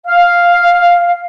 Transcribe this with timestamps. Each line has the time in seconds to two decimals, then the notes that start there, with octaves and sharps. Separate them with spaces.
0.06 F5